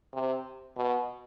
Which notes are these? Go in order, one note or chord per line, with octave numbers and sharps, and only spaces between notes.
C3
B2